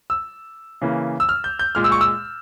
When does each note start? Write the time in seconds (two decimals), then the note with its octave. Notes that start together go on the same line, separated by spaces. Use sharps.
0.10 E6
0.81 C#3 E3 A#3
1.20 E6
1.29 F6
1.44 G6
1.59 G6
1.75 A#2 G#3 F6
1.84 E6
1.92 C#6
2.01 E6